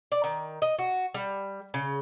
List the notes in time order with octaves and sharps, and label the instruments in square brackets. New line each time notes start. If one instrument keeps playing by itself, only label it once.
[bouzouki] D5
D#3
D#5
F#4
G3
C#3